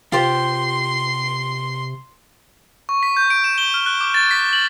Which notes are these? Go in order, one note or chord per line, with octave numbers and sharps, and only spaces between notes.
C3 F4 G4 C5 C6
C#6
B6
G6
D7
E7
G7
F6
F#6
D6
A6
B6
F#7